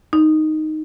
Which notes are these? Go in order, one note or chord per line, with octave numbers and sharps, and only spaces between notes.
D#4